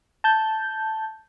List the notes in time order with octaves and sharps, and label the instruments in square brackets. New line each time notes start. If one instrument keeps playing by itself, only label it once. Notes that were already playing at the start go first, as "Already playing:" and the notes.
[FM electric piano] A5 G6